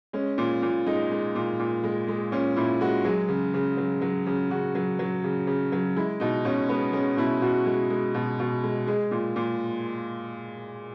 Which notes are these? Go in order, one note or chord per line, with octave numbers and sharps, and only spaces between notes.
G#3 C#4
A#2
A#2
G#3 D#4
G#3
A#2
A#2
G#3
G#3
A#2 C#4
A#2 E4
G#3 F#4
F#3 G#4
C#3
C#3
F#3
F#3
C#3
C#3 F#4
F#3
F#3
C#3
C#3
F#3
G#3 E4
B2 D#4
B2 C#4
G#3 B3
G#3 C#4
B2 E4
B2 F#4
G#3
G#3
B2
B2
G#3
G#3 G#4
A#2
A#2